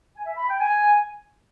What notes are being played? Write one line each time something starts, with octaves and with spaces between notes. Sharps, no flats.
G#5
E5
B5
G5
G#5